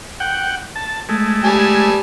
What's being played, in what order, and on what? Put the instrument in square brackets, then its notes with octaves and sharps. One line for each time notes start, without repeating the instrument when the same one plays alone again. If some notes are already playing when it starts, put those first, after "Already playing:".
[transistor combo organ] F#5 G5
A5
G#3 A3
[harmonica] G3 G#5 A5